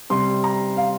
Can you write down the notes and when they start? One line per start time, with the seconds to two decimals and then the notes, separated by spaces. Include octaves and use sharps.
0.10 C3 G3 C6
0.44 A#5
0.77 F5